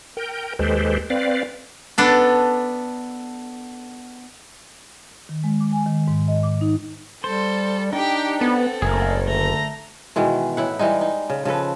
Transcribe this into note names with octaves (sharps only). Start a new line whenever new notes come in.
A#4 G5
D#2 G#3 G4 A4 B4 C5
C4 B4 D5 F5
B3 D4 A4
D#3
G#3
D6
G#5
D#3
G#2
D#5
D6
D#4
G3 A4 C5
D4 D#4 G4 G5
B3 C4 A4
F#1 A3 A#3 G#4 A#4
D3 A3 A#5
B2 D#3 E3 G#3
A2 E4 F#5
E3 G3 G#3 D#4
D#4
C#3
C#3 F3 A4 B4